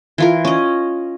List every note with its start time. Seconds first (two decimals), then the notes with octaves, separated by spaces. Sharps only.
0.18 E3 F4 A#4
0.45 C#4 D#5